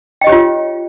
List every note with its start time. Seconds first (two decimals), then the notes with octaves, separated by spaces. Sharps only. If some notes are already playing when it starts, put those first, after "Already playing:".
0.21 G5
0.24 D#5
0.27 G4
0.29 C#5
0.32 F4